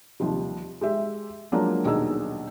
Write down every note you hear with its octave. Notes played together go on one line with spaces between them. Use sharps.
D#2 C3 F3 G3
G#3 G4 E5
F3 F#3 G#3 A#3 D4 F4
D#1 B1 D4 D#4 G#4 E6